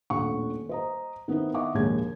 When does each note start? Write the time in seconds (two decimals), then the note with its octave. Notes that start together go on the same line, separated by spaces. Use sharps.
0.10 D#1 A2 D4 F#5 C#6
0.69 C5 D#5 A#5
1.28 D#3 B3 C4 D#4 E4
1.54 D#5 E5 F#5 C#6 D6
1.74 A#1 D#2 A#2 G#3 C#5 G#6